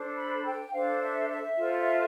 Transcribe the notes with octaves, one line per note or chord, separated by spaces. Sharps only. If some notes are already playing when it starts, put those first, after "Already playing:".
Already playing: D4 A4 C5
B5
G5
D4 A4 C5 F5
E5
E5
F4 A4 C5